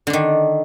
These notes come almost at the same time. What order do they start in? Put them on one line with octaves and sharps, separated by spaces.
D3 D4 D#3